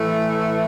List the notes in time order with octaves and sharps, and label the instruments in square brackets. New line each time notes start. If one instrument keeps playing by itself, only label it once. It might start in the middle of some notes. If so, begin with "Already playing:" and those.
Already playing: [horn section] A2 E3 A3